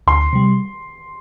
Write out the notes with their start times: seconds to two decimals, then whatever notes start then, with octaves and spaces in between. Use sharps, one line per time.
0.07 D2 C6
0.33 C3 G3